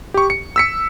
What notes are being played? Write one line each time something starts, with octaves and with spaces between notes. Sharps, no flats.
G4 C#6
C#7
E6 B6 C#7